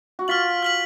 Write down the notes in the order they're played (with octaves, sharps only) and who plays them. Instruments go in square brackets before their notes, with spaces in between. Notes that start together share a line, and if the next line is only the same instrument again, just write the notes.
[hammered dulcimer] F#4
[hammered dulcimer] F4 [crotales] F6 B6 F#7
[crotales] F6 B6 F#7